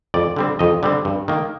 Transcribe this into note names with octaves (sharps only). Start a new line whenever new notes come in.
F2 D5
D3 G3 C4
F2 D#5
D3 G3 C4
G2
D#3 A#3